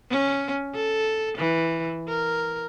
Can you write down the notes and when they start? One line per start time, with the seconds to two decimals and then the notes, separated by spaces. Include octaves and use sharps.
0.10 C#4
0.75 A4
1.38 E3
2.08 A#4